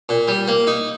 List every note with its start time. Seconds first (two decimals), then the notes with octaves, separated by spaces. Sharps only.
0.09 A#2
0.28 G3
0.48 A#3
0.67 D#4